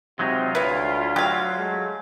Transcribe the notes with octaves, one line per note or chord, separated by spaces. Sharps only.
C3 F#3 G#3 D#4 F4
D2 E4 B4 C#5
F#3 G4 F5
G#3 A3